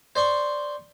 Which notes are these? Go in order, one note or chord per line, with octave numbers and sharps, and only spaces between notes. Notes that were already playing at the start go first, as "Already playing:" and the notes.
C5 D5 C6 C#6